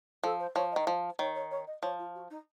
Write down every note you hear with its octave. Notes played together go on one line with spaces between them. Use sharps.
F3 A4
C5
F3 C#5
D#3 D#5
F3
D#3 C#5
C#5
C#5
D#5
F3 C#5
F4
F#4
D#4